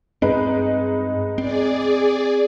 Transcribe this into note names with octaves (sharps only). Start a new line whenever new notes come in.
G2 G#3 C4 D#4 B4
C4 G#4 D5